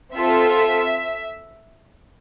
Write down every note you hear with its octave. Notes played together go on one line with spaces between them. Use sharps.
C4 F4 A4 E5